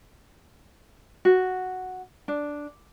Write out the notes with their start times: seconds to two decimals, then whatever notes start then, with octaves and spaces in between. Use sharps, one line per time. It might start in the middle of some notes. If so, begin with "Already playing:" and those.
1.25 F#4
2.28 D4